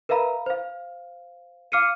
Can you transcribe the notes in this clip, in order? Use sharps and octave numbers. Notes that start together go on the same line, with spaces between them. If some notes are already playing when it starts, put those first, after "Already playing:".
A#4 B4 E5 F5 A#5 B5
C5 F5
F5 D6 F6 C7 C#7 D#7